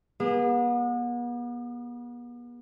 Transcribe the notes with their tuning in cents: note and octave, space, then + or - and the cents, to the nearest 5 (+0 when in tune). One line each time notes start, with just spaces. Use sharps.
B3 -40 G#4 -25